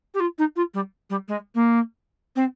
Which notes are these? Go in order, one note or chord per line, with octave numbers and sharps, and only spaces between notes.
G4
F4
D#4
F4
G3
G3
G#3
A#3
C4